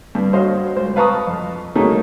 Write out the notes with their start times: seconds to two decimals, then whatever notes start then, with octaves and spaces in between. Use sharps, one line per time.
0.15 G2
0.33 F#4 C5 C#5 D#5 F5
0.76 C#2 C5
0.96 B4 F5 A5 A#5 C#6 D#6
1.27 F2
1.75 A3 A#3 C#4 D#4 F#4 G#4